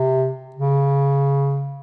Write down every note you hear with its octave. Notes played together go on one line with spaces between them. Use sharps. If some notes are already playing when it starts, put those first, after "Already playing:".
Already playing: C3
C#3